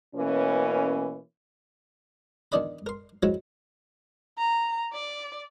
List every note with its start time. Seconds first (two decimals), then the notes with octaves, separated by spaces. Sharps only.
0.15 B2 E3 A#3 C#4
2.52 E2 D#3 D4 D5 D#5 B5
2.86 A#4 C6
3.23 F3 F#3 G#3 C#4 E4
4.38 A#5
4.93 D5